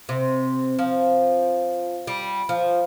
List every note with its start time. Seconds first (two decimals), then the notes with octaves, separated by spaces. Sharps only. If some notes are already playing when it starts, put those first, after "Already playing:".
0.09 C3
0.78 F3
2.07 G3
2.49 F3